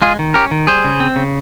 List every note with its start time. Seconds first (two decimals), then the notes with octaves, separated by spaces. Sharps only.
0.02 G#3 F4 G#4
0.19 D#3
0.34 C#4 G4 A#4
0.51 D#3
0.67 G3 G#4 C5
0.84 C#3
1.00 C4
1.16 C#3